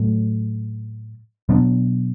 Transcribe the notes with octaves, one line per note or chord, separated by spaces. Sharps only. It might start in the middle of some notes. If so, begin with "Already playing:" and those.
Already playing: A2 F#3 A3
B2 F#3 B3 D4